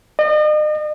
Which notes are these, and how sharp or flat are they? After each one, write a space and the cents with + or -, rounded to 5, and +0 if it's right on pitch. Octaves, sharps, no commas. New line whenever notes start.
D#5 -40